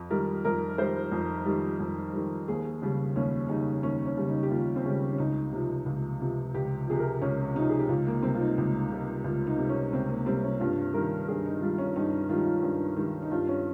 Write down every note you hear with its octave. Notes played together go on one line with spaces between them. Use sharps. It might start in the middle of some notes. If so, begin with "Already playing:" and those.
Already playing: F2
D#3 G3 A#4
F2 A#4
D#3 G3 C5
F2
D#3 G3
F2
D#3 G3
D#2 G#4
C#3 G3
D#2 C#4
C#3 G3 D#4
D#2 C#4
C#4
C#3 G3
D#4
G4
D#2 F4
C4
C#3 G3 C#4
C#4
C#2 D#4
C3 F3
C#2
C3 F3
C#2 G4
C3 F3 G#4
A#4
C#2 C#4
C3 F3 D#4
G#4
G4
C#2 F4
A#3
C3 G3 C4
F4
D#4
C#2
C3 G3
C#2 F4
D#4
C3
G3
C#4
C#2 C4
A#3
C3 G3 C4
C#4
G2 F4
D#3 G3 A#4
G2 G#4
D#4
D#3 G3 F4
C#4
G2 D#4
D#3 G3 D#4 F4
F4
G2
D#3 G3
D#4
G2 F4
C#4